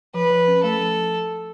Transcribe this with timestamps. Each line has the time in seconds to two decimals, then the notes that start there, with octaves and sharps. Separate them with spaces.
0.14 F3 B4
0.30 F3
0.47 C#4
0.63 A3 A4
0.80 F3